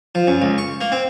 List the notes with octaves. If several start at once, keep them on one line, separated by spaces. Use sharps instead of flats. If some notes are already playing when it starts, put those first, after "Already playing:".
F3
F#2
C#2
C#6
A#3
C4